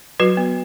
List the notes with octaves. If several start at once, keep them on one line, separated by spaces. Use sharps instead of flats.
F#3 F#4 B4
B3